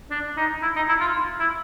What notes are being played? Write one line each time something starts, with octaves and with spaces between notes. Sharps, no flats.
D4
D#4
E4
D#4
E4
F4
E4